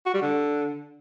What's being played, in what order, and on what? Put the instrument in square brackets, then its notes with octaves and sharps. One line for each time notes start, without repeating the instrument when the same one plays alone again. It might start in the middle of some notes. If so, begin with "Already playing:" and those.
[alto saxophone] F#4
G3
D3